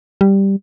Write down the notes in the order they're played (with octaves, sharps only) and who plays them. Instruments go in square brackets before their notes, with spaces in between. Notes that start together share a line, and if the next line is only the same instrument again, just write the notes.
[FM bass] G3